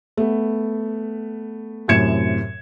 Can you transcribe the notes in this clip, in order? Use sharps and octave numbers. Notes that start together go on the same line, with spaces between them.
A3 B3
F#2 A2 C3 G#6 C#7 E7